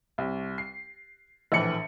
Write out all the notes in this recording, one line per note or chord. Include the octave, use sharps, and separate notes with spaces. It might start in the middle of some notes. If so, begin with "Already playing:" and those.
C2
C7
A#1 A2 E3 C#7 F#7